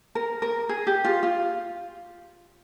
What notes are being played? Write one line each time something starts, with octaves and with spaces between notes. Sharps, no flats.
A#4
A#4
G#4
G4
F4
F4